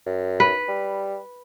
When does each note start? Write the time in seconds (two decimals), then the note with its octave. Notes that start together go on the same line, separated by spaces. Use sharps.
0.06 F#2
0.40 B4
0.68 G3